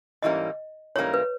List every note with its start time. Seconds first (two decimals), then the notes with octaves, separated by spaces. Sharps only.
0.22 G#2 E3 G3 A#3 C#4 D#5
0.96 G#2 E3 G3 A#3 C#4 C#5
1.14 B4